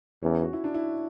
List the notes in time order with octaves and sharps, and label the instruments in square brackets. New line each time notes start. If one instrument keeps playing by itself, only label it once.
[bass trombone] E2 [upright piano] C#4
[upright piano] F#4
E4
D4
E4